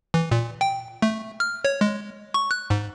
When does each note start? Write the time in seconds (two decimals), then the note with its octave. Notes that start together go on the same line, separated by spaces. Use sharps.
0.14 E3
0.31 A#2
0.61 G5
1.02 A3
1.40 F6
1.65 C#5
1.81 G#3
2.34 C#6
2.51 F#6
2.70 G#2